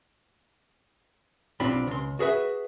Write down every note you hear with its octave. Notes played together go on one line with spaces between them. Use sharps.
B1 C4 D4 F4 G4 B5
C#2 C6
F#4 G#4 B4 E5